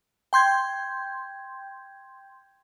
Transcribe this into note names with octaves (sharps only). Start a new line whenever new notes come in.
G5 C6 G6 G#6